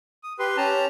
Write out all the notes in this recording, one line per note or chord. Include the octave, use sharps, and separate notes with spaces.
D#6
G4 B4 C6
C#4 G4 A5 A#5